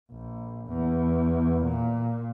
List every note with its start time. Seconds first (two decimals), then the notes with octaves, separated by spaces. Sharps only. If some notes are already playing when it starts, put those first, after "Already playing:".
0.11 A#1
0.68 E2
1.64 A#2